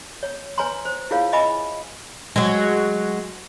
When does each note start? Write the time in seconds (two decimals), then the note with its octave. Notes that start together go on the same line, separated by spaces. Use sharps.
0.23 C#5
0.58 B4 C#5 G#5 A#5 C6
0.85 C5
1.11 E4 F4 G#4 A#4 C#5 F5
1.33 D#5 E5 G#5 B5 D6
2.36 F#3 G#3